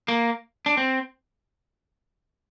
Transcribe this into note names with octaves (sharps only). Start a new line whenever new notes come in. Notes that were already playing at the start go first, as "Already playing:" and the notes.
A#3
D4
C4